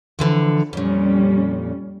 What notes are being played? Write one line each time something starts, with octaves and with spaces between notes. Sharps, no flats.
D3 E3 F3
F2 A#2 G3 C#4